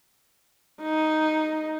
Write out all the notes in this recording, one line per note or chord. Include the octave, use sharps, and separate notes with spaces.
D#4